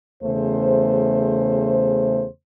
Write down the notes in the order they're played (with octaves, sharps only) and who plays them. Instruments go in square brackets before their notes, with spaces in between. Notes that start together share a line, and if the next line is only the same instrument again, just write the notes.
[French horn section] E2 C#3 A3 C5